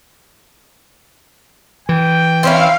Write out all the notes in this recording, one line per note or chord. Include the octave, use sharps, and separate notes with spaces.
E3 G5
C4 C#4 E4 F5